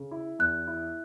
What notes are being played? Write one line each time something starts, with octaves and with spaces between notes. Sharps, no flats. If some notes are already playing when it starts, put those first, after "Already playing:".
Already playing: C#3
E4
E2 F#6
E4